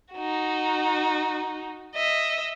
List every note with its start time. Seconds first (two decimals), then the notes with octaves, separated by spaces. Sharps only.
0.14 D#4 F#4
1.95 D#5 E5